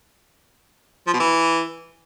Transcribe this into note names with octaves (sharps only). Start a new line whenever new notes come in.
F3
B2
E3